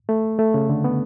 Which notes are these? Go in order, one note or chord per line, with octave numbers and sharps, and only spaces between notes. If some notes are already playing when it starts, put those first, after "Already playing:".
A3
A3
C#3
D3
B3